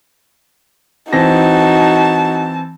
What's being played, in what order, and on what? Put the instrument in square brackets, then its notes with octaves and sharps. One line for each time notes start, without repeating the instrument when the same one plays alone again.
[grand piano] E3 C4 A#6 [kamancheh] D#4 F#4 [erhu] A5